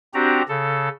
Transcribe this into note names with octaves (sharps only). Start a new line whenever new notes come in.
C4 D4 F#4 G4 A#5
C#3 A4